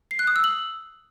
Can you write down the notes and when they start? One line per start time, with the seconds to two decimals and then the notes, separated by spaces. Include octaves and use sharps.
0.11 C7
0.19 F#6
0.27 D#6
0.36 E6
0.44 F#7